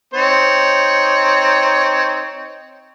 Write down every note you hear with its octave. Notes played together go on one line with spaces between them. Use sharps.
C4 D#4 C#5